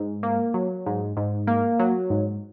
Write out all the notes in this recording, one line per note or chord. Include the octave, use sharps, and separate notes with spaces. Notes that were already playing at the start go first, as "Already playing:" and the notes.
Already playing: G#2
A#3
F#3
G#2
G#2
A#3
F#3
G#2